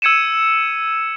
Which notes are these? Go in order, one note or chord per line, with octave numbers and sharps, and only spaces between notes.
E6 G#6 C#7 D#7 E7